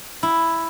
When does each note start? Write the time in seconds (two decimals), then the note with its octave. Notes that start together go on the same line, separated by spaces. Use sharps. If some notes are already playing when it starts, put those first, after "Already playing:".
0.23 E4